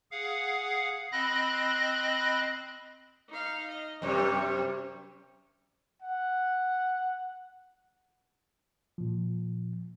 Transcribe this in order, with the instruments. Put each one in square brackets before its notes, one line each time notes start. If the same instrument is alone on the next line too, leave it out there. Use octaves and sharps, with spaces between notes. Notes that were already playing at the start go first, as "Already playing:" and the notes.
[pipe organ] G#4 F5 F#5
C4 D#5 B5 F#6 A#6
[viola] D#4 F5
D#5
[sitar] F#2 C3 G3 [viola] C#5
[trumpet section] F#5
[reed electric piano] A#2 F3